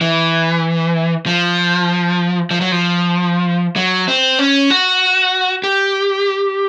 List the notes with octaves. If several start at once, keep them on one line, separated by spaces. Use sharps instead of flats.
E3
F3
F3
F#3
F3
F#3
C4
C#4
F#4
G4